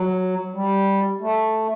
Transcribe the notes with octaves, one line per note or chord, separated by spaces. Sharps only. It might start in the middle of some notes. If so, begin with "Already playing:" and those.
Already playing: F#3
G3
A3